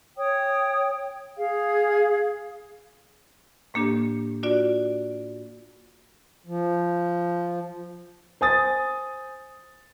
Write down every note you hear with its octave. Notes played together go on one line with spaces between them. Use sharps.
C#5 G5 D#6
G#4 F5
A2 A#3 D4 G4
D4 F4 F#4 D5
F3
C5 G#5 D#6 A6